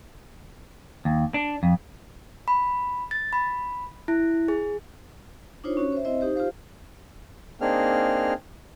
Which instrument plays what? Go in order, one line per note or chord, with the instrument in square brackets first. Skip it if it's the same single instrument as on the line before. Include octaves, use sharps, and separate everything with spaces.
[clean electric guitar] D#2
D4
F2
[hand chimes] B5
A6
B5
E4
G#4
[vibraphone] D4 D#4 F4 C5 C#5
C#4 F#4 C#5
C5 E5
C4 E4 C5 D#5 E5
D#4 G4 C5
F4 G4 C5 F5
[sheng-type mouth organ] A#3 C4 D4 D#4 G#4 F6